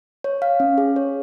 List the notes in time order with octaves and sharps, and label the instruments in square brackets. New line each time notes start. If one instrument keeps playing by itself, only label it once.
[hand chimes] C#5
F5
C#4
G#4
C#5